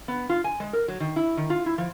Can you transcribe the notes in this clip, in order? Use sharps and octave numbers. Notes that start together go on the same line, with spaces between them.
B3
F4
G#5
G#3
A#4
F#3
D#3
E4
D#3
F4
E4
F3